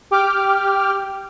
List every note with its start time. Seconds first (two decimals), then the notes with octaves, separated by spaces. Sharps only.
0.11 G4 G5 D6 F6